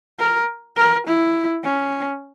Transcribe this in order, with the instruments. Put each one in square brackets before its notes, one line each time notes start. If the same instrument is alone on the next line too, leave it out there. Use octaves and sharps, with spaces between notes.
[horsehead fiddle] A#4
A#4
E4
C#4